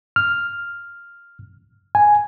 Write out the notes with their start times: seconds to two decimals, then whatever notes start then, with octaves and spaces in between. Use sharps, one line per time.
0.16 F6
1.95 G#5